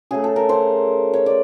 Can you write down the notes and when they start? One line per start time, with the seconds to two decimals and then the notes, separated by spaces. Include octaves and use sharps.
0.11 C#3 F#3 A3 G#4
0.24 A4
0.36 A#4
0.49 C5
1.13 C#5
1.26 D5